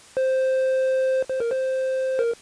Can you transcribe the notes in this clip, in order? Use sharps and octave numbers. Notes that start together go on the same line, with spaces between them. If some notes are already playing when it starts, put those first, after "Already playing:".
C5
C5
A#4
C5
A#4